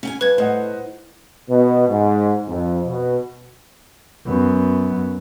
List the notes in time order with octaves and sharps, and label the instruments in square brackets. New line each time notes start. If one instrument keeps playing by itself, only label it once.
[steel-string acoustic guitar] C#4 G5 G#5
[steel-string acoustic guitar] G2 [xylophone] B4 G#6
[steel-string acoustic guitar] A2 [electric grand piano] C5 D#5 F#5
[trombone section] B2
G#2
F2
B2
[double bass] F#2 B3